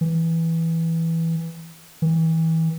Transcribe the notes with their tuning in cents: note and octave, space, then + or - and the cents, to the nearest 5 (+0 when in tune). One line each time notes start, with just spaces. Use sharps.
E3 -5
E3 -30